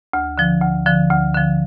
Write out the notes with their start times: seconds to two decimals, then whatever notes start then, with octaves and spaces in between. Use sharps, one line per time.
0.13 D2
0.38 D3 F3
0.62 D2
0.86 D3 F3
1.10 D2
1.35 D3 F3